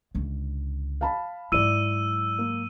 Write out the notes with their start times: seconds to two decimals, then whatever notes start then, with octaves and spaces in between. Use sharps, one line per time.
0.15 C#2 D3
1.01 F5 A5 B5
1.52 G#2 F#3 E4 D5 E6 D#7
2.39 A#3